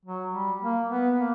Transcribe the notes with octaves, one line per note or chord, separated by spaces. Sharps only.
F#3
G3
A#3
B3
A#3